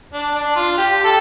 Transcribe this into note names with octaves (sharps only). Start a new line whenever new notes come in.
D4
D4
F4
G4
A4